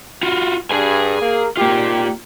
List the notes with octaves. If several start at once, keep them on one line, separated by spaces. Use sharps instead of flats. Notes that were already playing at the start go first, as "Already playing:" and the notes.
F4 F#4
G2 G#4 G#5
A#3
G#1 D#3 A#3 F4 G4